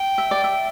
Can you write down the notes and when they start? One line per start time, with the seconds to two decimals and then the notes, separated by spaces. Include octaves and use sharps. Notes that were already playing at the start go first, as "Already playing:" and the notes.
Already playing: G5
0.18 E5
0.31 D5
0.44 E5